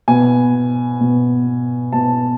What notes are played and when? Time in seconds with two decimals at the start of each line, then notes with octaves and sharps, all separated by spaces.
0.08 B2 G#5
1.00 B2
1.93 B2 A5